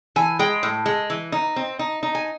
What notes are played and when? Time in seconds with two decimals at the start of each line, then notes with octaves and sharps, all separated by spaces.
0.16 E3 G#5
0.39 G#3 G5
0.63 A2
0.86 G#3
1.10 E3
1.32 D#4
1.56 C4
1.79 D#4
2.03 D#4
2.15 G#5